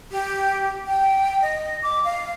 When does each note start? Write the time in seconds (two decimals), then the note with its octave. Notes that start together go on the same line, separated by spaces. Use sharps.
0.11 G4
0.87 G5
1.42 D#5
1.83 D6
2.05 F5